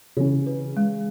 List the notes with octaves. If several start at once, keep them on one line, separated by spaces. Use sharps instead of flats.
C#3 E3 C#4 C#5
B4
G#3